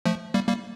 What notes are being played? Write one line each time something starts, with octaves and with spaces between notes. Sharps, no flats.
F3 A3
G3 A#3
G3 A#3